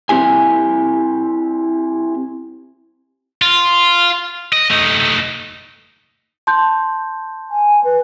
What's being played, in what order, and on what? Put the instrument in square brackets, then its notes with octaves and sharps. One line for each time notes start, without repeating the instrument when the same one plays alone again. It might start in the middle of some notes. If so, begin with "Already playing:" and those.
[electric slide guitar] C4 E4 G4 G#5
[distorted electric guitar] F4
D#5
A3 D#4
[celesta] A5 C6 G6
[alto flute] G#5
B4